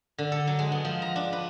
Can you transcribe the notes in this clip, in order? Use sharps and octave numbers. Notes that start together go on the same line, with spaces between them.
D3
A4
F#3
G#3
B3
F3
A#5
D4
B4